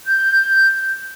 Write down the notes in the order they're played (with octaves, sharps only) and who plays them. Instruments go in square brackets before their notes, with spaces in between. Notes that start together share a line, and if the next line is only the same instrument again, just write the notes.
[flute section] G6